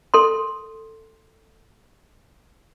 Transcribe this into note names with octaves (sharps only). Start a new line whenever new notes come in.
A4 C6